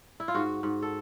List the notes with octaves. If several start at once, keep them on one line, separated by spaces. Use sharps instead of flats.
E4
F4
G#2 F#4
G#2
A4